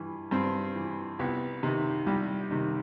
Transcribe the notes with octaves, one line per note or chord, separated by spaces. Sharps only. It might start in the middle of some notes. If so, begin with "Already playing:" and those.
Already playing: G2 E3
G2 C4
E3
C2 B3
C3 D#3
C2 G3
C3 D#3